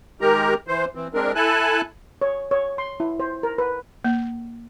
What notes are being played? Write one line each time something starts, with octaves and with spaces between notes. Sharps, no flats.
D#3 G#3 G4 A#4 A#5
E3 C5
E3 C4
G#3 C4 D4 A#4
E4 A4 G#5 A5 F#6
C#5
C#5
C6
E4
C5
A#4
B4
A#3